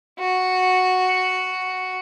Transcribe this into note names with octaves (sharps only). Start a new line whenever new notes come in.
F#4